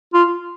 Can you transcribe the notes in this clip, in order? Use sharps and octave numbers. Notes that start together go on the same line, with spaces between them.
F4